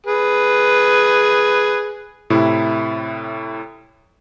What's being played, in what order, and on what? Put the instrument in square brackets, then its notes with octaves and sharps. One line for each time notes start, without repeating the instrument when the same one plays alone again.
[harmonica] G#4 B4
[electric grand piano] A2 C3 E4